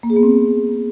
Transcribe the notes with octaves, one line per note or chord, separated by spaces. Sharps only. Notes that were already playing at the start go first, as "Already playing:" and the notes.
A#3
G#4
B3
C4